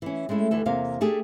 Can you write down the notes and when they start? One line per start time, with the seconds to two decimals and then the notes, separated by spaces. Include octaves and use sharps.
0.02 E3 C#4
0.29 G#3 A3 C#4 E4
0.51 D2 E3 A4
0.66 E2 C3 A#3 F5
1.01 A3 D4 G4 G#4